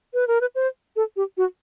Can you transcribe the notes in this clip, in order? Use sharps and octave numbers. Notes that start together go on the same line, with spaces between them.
B4
A#4
B4
C5
A4
G4
F#4